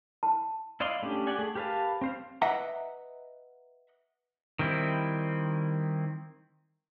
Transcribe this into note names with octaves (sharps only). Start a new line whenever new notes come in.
A5
E4 D5 D#5 F5 C6
A3 C#4 D4 G4
G4 D5 F#5 G#5
A3 G#4
G4 A#4 B4 F5 A5
C4 C5 F5
B4 D#5 E5 F#5 A#5
D#3 G3 C4 E4